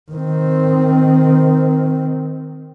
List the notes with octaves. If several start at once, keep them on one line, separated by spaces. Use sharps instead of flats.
D#3 C4